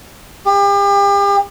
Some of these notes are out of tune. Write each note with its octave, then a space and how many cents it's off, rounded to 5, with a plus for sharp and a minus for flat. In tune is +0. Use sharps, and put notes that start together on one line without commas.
G4 +40